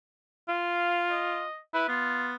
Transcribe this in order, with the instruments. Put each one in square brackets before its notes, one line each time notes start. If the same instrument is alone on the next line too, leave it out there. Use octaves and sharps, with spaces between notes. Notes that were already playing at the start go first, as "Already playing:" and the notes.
[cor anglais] F4 [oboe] F5
[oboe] D#5
[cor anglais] E4 [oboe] B4
[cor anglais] B3 [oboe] F4